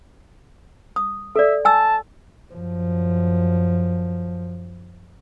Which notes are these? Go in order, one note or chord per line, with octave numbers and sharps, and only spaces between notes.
D#6
A4 D5 E5
G#5 A5 E6
F#2 F3